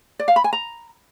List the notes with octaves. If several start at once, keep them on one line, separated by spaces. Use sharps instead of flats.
D5
F5
B5
G#5
A#5